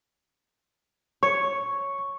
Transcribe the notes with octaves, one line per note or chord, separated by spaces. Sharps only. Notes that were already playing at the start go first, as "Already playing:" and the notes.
C#5 C#6